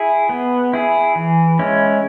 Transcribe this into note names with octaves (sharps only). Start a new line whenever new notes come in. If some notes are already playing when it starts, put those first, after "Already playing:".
Already playing: E4 G#4
B3
E4 G#4
E3
G#3 C#4 E4